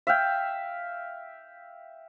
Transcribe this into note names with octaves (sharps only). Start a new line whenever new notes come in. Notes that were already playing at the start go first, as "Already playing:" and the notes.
E5 F5 G5